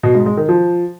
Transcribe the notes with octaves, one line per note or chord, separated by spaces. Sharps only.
B2
G#2
G#3
D#3
F3